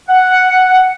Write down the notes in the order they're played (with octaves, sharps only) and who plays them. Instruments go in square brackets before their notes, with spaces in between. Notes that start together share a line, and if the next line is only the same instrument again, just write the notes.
[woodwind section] F#5